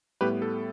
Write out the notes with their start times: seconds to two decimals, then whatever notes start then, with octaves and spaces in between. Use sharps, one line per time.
0.21 A2 G3 B3 G4 B4
0.42 A4